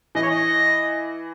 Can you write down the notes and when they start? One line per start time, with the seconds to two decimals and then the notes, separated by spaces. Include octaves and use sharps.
0.15 E3 D#5
0.23 C#5
0.30 D#5